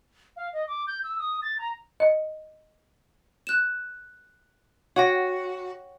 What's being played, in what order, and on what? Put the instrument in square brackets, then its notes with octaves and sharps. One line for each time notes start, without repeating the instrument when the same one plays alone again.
[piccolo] F5
D#5
D6
G6
E6
D#6
A6
A#5
[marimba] D#5
[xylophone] F#6 E7
[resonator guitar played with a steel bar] F#4 [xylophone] C#5 G5 A#6